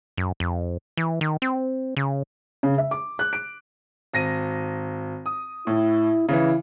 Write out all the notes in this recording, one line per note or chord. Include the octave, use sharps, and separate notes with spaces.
F#2
F2
E3
D#3
C4
C#3
C#3
E5
D6
F#6
D7
G#1 A#6 D#7
D#6
A2 E4
C#3 E3 E4